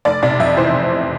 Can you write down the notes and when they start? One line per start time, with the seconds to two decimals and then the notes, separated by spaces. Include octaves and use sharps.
0.05 F1 D5
0.23 C3 D5
0.40 F2 E5
0.57 E3 C5